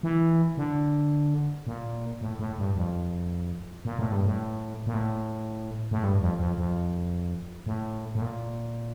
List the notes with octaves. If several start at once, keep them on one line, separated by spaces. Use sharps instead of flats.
E3
D3
A#2
A2
A2
G2
F2
A#2
A2
G2
A2
A#2
A2
A2
G2
F2
F2
F2
A2
A2
A#2